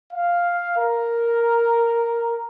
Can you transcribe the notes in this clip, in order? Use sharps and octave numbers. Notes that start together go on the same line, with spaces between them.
F5
A#4